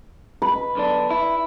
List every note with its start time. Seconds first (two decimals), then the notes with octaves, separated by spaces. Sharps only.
0.42 B4
0.75 B1 D3 D4
1.11 E4